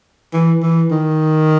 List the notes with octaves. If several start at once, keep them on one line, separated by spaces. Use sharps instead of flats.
E3
E3
D#3